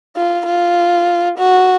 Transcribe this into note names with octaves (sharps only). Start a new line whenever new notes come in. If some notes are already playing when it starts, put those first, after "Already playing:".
F4
F4
F#4